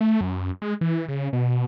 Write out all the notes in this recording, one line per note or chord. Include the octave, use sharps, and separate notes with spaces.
A3
F#2
G#3
E3
C#3
B2